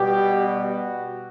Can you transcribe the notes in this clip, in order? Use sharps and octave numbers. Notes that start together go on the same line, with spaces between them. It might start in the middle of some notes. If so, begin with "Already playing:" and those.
Already playing: B2 G3 B3 G4
F#4